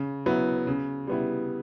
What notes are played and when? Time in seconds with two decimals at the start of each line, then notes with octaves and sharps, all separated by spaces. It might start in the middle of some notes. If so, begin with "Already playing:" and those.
Already playing: C#3
0.26 F#3 B3 E4
0.67 C#3
1.07 G3 B3 E4